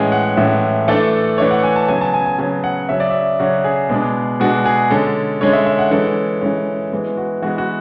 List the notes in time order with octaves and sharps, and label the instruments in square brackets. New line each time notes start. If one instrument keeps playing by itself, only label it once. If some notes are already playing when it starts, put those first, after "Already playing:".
Already playing: [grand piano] A2 E3 G#3 C#4 G#5
F#5
A2 E3 G#3 C#4 E5
E3 A3 D4 A4
E3 A3 D4 C#5
F#5
G#5
A5
C#3 F#3 B3 G#5
A5
G#5
G#5
C#3 F#3 B3 G#5
F#5
C#3 F#3 C#4 E5
D5
E5
C#3 F#3 C#4 F#4
G#4
B2 G#3 B3 D4
B2 G#3 B3 D4 F#4
G#4
D3 G#3 C#4 A4
D3 G#3 C#4 C#5
E5
E5
F#5
E3 G#3 C#4 A4
E3 G#3 C#4
E3 G#3 B3
F#4
E3 G#3 B3 F#4
F#4